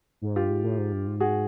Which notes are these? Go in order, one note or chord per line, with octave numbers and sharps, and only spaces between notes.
G#2
G2 F4 G4
G#2
A2
G#2
G2
G#2
F#4 G#4